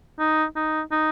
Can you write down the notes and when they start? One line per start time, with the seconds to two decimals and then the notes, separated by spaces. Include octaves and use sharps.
0.19 D#4
0.56 D#4
0.91 D#4